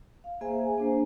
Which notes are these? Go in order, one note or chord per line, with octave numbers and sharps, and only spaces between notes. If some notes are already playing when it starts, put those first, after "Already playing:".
F5
A#3 G#4 C5 E5 G#5
A#3 D4 C5